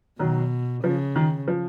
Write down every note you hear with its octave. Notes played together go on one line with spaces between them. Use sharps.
B2 D#3 F#3
C#3 F3
D#3
F3